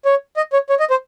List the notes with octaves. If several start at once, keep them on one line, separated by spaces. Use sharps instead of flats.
C#5
D#5
C#5
C#5
D#5
C5